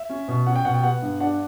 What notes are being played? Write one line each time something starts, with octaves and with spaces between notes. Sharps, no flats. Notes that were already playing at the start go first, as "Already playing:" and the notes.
Already playing: E5
C#4
B2
C#4 F#5
G5
B2 F#5
G5
B3 F#5
G2
D4 F#5